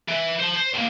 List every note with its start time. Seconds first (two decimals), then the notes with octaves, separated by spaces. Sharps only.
0.08 E3
0.39 C5 A5
0.56 C5
0.74 A2 A#3